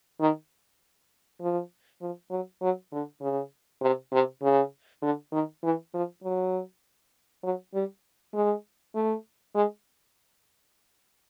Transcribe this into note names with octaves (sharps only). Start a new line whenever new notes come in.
D#3
F3
F3
F#3
F#3
D3
C#3
C3
C3
C#3
D3
D#3
E3
F3
F#3
F#3
G3
G#3
A3
G#3